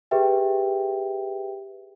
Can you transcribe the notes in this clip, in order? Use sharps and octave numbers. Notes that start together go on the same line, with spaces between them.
G4 G#4 B4 E5 G5